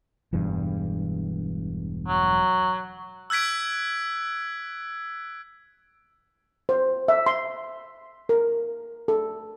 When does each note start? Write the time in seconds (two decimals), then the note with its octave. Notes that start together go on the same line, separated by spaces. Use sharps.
0.33 E1 E2 G2
2.08 F#3
3.30 E6 F#6 G#6 B6 D7
6.69 C5
7.08 E5
7.26 C6
8.29 A#4
9.08 A4